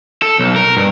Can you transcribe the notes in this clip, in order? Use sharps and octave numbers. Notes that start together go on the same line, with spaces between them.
A4
B1
A#4
G2